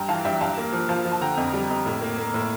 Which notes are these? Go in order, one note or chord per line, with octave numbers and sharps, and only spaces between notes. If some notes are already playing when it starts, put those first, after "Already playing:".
Already playing: G2 G5 A#5
E3 F5 A5
G2 E5 G5
G2 F5 A5
A#3
F3
F3 F5 A5
F3
A5
D3 G5 A#5
F2
G3
F2
A2
A#3
A#3
A2